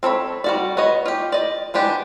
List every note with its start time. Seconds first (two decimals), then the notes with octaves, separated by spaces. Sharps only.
0.03 C4 A4 C#5 B5
0.44 G3 F#4 D5
0.77 B3 C#5 D#5
1.06 F4 G4
1.32 D5 D#5
1.74 G#3 B3 D4 G4